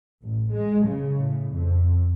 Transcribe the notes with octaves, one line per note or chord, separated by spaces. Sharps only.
A1
G#3
C#3
A2
F2